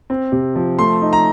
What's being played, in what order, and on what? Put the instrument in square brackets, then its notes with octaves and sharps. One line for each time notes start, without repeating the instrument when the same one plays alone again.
[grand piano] C4
C3
F3
A3 C6
D#4
A#5